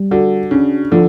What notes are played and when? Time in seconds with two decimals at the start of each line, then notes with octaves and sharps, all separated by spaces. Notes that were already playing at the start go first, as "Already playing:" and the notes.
Already playing: G3
0.11 D3 F#4
0.51 C#3 D4
0.92 D3 F3